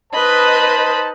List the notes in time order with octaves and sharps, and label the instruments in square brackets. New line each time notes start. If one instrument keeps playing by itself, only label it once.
[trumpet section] D#4 C5 A5 [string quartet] B4 D#5 B5